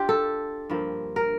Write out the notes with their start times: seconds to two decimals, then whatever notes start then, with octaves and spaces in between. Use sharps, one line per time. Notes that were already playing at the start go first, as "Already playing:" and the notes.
Already playing: D4 F4 G4
0.09 A4
0.70 G2 F3 A#3
1.16 A#4